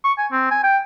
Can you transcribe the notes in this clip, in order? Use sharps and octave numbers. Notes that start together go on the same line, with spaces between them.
C#6
G#5
C4
G#5
G5